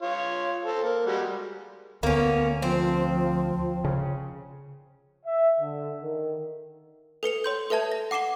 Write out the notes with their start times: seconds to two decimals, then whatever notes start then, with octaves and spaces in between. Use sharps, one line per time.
0.02 F4 C#5
0.65 A4 C5
0.83 A#3
1.06 G3 G#3 F#4
2.03 D2 A#3 B3 C#4
2.62 F3 C4
3.84 C#3
5.25 E5
5.59 D3
6.02 D#3
7.23 A4 B4 C#7 F7
7.44 C#5 C6 G6
7.70 A4 B4 E5 A5 G#6
7.92 A#6
8.11 F#5 D6 C7 E7 G7